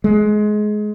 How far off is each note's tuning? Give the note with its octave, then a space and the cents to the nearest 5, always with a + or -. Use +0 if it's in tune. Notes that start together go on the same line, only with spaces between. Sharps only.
G#3 +20